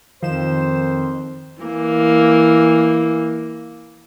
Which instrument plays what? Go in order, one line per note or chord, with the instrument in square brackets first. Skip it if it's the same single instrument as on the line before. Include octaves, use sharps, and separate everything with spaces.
[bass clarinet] F2 [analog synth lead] D#3 [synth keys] F3 E7 [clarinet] C5
[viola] E3 A#3